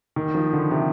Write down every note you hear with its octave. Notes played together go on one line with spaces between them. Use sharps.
D#3
F3
D3
C3